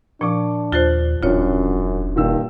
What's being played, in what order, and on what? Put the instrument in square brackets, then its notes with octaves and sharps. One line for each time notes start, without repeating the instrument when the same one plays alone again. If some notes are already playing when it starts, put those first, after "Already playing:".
[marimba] A#2 F3 [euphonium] D4 [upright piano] C#6 D6
[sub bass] D#2 [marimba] F4 C5 [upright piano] F#6 A6 G7
[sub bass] E1 [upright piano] A1 D4 [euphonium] F#2 [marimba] F4 C#5
[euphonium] G2 [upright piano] A#2 D#3 E6